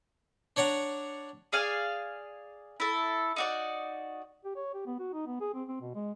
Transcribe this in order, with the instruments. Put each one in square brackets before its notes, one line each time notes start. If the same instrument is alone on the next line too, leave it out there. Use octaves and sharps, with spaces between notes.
[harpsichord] D4 C#5 D5 F#5 A#5
[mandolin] G#4 D5 F5 G#5
E4 A4
D#4 F#4 D5
[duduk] G4
C#5
G4
B3
F#4
D#4
B3
G#4
C4
C4
B2
G#3